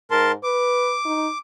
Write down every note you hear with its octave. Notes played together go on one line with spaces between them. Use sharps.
G#2 A#4 A5 C6
B4 D6
D#4